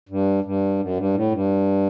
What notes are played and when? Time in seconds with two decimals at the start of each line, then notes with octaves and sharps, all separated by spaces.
0.09 G2
0.44 G2
0.79 F#2
0.97 G2
1.14 A2
1.32 G2